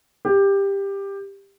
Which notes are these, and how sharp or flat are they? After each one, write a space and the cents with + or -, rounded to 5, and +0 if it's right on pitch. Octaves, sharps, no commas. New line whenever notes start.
G4 +15